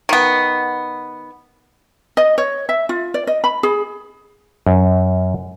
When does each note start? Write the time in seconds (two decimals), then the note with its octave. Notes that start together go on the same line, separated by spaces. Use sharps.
0.09 D#3 B3
2.17 D#5
2.38 C#5
2.69 E5
2.89 F4
3.14 D5
3.27 D#5
3.44 B5
3.63 G#4
4.67 F#2